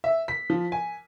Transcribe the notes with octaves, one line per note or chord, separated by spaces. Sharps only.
E5
B6
F3
G#5